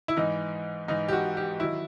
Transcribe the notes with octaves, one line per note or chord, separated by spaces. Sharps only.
E4
G#2 E3 D#4
G#2 E3 D#4
G4
F#4
G4
D#3 F#3 E4